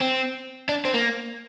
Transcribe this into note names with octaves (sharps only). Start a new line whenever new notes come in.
C4
D4
C4
A#3